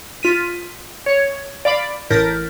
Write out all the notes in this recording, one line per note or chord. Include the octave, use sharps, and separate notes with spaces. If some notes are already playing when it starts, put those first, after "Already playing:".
F4 B6 D#7
C#5
D5 F5 B5 D6
A1 A2 A#4 G6 A6 B6